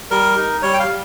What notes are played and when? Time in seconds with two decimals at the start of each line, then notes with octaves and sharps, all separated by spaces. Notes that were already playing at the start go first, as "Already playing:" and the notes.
0.11 G3 A#4
0.37 D#4
0.62 G3 C#5
0.73 G5
0.79 F5
0.87 G3